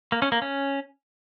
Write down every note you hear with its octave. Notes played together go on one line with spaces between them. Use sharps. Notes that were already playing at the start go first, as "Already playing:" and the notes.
A#3
C#4
A#3
C#4